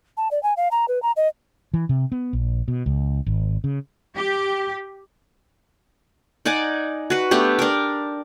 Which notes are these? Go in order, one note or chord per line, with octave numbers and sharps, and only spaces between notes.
A5
D5
G#5
F5
A#5
B4
A#5
D#5
E3
C3
B3
A#1
B2
C#2
G#1
C#3
G4
D#4 D5 F#5 G#5
F#4 B4
A3 B3 D4 G4
D4 A#4